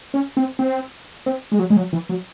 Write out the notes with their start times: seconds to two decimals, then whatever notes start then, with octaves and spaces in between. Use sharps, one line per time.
0.14 C#4
0.37 C4
0.59 C4
1.26 C4
1.52 G#3
1.59 F#3
1.70 G#3
1.77 F#3
1.93 E3
2.10 F#3